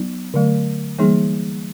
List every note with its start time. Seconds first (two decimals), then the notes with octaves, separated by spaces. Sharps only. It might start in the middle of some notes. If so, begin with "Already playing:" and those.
Already playing: F#3 B3 D#4
0.34 D3 F#3 A3
0.99 E3 G3 A#3 D#4 G#4